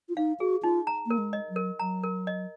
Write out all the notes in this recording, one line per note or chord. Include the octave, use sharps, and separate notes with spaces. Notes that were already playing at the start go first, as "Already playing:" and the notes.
F4
D#4 F5
F#4 G#4
D#4 F4
A#5
A#3 A#4
G#3
D#5
F#3
A#4
F#3 A#5
A#4
D#5